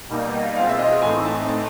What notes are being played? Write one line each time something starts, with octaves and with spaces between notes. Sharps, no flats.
B2 G3 A#3 D#4
B2 G#3 C4 F4 F5
E5
D#5
A2 E3 A3 C4 D#4 G#5
A5
A5